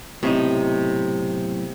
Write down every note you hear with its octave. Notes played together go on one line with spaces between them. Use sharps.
B1 A2 C3 D#4